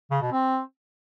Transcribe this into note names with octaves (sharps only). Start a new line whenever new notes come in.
C#3
B2
C4